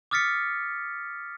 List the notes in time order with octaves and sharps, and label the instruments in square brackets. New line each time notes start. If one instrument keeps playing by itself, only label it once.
[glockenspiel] D6 D#6 F6 A6 B6 C#7